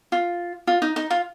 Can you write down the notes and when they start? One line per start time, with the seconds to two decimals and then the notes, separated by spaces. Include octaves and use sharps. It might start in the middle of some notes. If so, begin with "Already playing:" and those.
0.12 F4
0.67 F4
0.82 D#4
0.96 D#4
1.10 F4